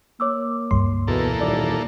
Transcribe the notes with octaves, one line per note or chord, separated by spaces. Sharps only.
A#3 C#5 D6 E6
C#2 G2 C6
E2 B2 A#3 A4
D#1 D5 D6